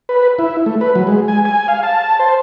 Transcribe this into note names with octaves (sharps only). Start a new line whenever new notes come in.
B4
E4
A3
B4
F#3
G#3
G#5
G#5
F5
A5
C5